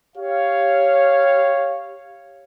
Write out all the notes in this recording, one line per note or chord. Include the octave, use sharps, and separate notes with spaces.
G4 C#5 F5